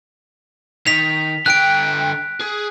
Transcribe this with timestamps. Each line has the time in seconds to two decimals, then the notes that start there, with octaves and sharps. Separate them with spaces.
0.87 D#3 B6 F7
1.46 D3 G5 F#6 D7
2.40 G#4